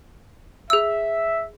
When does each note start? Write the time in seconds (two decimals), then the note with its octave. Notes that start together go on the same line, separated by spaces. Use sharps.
0.70 G#4 E5 E6